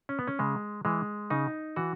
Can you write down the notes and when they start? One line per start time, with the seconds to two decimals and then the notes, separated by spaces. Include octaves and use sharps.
0.09 C#4
0.19 B3
0.27 C#4
0.39 C#3 G#3
0.85 E3 G#3
1.30 C#3 D#4
1.76 E3 F#4